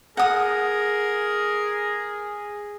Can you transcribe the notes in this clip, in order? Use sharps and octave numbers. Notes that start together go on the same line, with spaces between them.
G#4 A#4 F#5 D#6